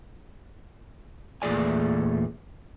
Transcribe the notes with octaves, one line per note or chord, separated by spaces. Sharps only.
E2 A#2 A3 G#4 D5 G#5